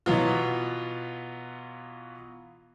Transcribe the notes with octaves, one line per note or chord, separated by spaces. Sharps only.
B2 E3 F#3 B3 F4